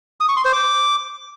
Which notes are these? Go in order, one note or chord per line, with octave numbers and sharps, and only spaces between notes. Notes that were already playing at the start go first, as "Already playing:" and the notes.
D#6
C#6
C6
C5
D6